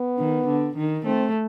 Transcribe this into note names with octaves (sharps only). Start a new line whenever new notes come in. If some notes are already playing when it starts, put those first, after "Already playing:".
Already playing: B3
D#3
D3
D#3
A3 C4